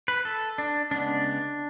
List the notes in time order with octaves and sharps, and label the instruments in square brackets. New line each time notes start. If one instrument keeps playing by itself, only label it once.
[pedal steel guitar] B4
A4
D4
C#3 G#3 B3 D4